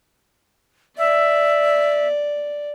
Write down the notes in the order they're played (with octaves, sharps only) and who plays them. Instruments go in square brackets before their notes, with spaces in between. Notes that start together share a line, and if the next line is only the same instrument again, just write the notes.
[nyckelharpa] D5 [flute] E5